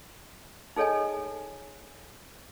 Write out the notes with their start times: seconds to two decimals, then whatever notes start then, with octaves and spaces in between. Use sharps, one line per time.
0.76 D#4 G#4 A4 C#5 D#5 G#5